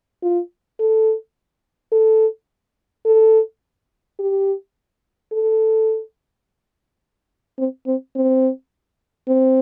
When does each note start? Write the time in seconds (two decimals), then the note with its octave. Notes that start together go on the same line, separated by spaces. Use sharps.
0.22 F4
0.80 A4
1.92 A4
3.05 A4
4.19 G4
5.32 A4
7.58 C4
7.87 C4
8.15 C4
9.28 C4